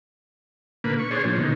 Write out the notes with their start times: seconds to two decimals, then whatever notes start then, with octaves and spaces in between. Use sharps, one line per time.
0.84 A#2 D3 A#3 B4
0.99 C#6
1.11 D4 G#4 C5 C#5
1.25 A#2 F3
1.37 B2 D3 D#3